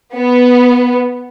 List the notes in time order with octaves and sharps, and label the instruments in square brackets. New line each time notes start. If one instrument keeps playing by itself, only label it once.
[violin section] B3